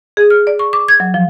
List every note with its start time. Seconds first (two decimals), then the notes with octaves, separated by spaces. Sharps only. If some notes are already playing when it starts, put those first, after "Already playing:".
0.17 G#4
0.30 F6
0.47 D5
0.59 C#6
0.73 D6
0.88 G#6
1.00 F#3
1.14 F3